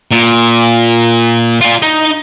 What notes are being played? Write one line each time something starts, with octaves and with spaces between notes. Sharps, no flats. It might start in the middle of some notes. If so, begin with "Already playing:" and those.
A#2
F4 D5
D#4